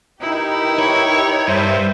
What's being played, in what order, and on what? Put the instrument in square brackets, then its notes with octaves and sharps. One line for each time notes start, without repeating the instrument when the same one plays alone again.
[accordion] D#4 [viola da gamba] E4 [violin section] G4 A#4 B4
[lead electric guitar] C#5
[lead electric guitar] G2 [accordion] C5 E5